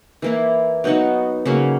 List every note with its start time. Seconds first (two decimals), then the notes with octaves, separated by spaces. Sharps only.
0.22 E3 A#3 E4
0.84 F#3 B3 D#4 F#4
1.46 C#3 F#3 A#3 C#4